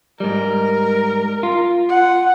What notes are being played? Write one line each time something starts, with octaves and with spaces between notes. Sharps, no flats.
G#2 G3 A#4
F4
F#5